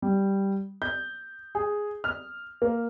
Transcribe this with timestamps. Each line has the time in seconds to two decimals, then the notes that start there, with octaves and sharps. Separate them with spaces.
0.02 G3
0.82 G6
1.55 G#4
2.04 F6
2.62 A#3